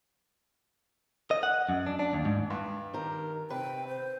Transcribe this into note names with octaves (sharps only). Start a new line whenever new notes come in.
D#5
F#5
F#2
D4
D4
D#2
G#2
G2
D#3 G4 A#4
C3 B4 G5
C5